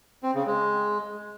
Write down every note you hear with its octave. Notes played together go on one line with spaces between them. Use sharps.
C4
C#3
G#3